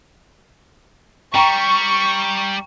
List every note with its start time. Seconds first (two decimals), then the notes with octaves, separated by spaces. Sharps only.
1.35 G3 G5 A#5 C#6